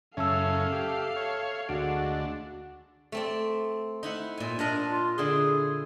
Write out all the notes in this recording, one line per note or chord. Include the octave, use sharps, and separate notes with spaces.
F#2 C#3 C#4 A4 E5 F5 A5 E6
G4
C#5
D2 G#3 D4 F#4 D7
A3 C4 D5
D#4 E4 F#5
A#2 G#5
A#2 D4 A#4 D#5
F4
D3 E4 G#4 C6